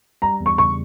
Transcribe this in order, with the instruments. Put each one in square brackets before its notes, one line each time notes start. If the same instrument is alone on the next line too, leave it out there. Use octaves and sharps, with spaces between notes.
[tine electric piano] G3 [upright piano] A#5
[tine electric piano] E2
[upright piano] C#6
[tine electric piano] C#3 [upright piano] C#6